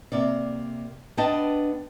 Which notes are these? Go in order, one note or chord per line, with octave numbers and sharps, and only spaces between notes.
C3 A#3 D5
B3 D4 D#5 G5 A5